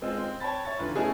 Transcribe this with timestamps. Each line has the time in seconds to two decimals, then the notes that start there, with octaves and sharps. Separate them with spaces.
0.02 G#3 C4 F4 D#5 E6
0.18 C4
0.40 C#5 G5 A5 B5 A6
0.65 C#5 E5 C#6 A6
0.79 F1 D3 F4 B4
0.96 A3 B3 C#4 E4 G#4 D#5